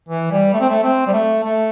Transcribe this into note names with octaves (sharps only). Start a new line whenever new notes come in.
E3
G3
A3
C4
A3
C4
G3
A3
A3